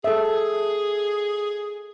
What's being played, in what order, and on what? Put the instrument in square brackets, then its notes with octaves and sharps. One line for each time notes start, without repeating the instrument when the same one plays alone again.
[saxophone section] G#4 [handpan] A4 E5